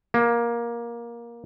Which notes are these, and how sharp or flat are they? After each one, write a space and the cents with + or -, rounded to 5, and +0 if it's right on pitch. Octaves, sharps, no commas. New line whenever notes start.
A#3 +15